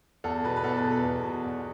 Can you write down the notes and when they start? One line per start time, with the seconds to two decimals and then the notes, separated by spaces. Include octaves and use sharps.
0.24 E2 A4
0.44 B2 B4
0.56 B4
0.64 E2 A4
0.77 B4
0.84 B2
0.91 A4
1.04 E2
1.24 B2
1.44 E2